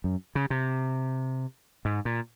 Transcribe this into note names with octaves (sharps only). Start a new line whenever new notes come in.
F#2
C#3
C3
G#2
A#2